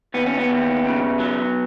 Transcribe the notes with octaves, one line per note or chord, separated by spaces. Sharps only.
D#2 B3
C#4
B3
D#2
C#3
F#3